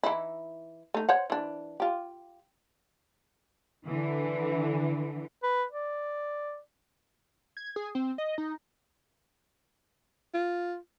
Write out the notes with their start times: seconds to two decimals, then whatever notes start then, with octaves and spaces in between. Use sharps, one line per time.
0.03 E3 D#4 E4
0.94 A3 D#4
1.09 C5 C#5 F#5
1.30 E3 D4
1.80 F4 G4
3.87 D3 E3
5.43 B4
5.71 D5
7.57 G#6
7.76 G#4
7.95 C4
8.18 D#5
8.38 D#4
10.34 F4